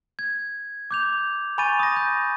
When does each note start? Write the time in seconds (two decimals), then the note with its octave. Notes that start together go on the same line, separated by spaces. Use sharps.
0.19 G#6
0.91 D6 G6 F7
1.58 G#5 B5 C#6 G6 A6 D#7
1.79 D#6 A#6
1.96 G6